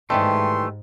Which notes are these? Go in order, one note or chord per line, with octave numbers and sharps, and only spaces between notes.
G#2 D#3 E3 G3 A3 C6